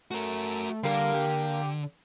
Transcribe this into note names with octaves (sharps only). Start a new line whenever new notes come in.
A3 F#4 A#4
D3 G3 A#3 A#4
G4